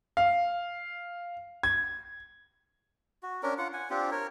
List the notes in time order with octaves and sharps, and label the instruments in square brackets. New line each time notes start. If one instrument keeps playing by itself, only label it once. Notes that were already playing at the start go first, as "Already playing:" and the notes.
[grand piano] F5
G#6
[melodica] F#4
C#4 D4 A#4
F4 F#5
F#5 G#5
C4 D4 F4 G4
A#4 C#5